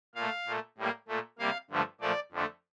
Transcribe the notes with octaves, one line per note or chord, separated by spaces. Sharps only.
A#2 A3 F5
A#2 A3
A2 G3 A#3
A#2 A3
C3 G3 A#3 F5
G2 D3 F3 A3
A#2 F3 A3 D5
F2 D3 A3